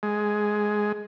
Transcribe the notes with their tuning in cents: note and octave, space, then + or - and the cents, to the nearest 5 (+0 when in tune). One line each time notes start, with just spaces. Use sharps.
G#3 +10